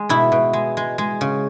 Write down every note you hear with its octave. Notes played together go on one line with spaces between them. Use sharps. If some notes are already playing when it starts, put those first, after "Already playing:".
Already playing: G#3
B2 E4
B2
G#3
G#3
G#3
C#3